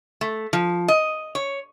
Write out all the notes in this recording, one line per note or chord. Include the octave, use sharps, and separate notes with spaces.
A3
F3
D#5
C#5